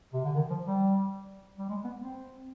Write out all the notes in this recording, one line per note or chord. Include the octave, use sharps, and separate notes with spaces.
C3
D3
D#3
F3
G3
G3
G#3
B3
C4